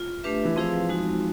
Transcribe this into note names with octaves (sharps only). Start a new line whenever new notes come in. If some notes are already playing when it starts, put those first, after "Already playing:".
Already playing: F4
A3 D4 G4 B4 E5
E3
F3 C4 E4 G#4 C5 F5
G#3 C4 D#4 F#4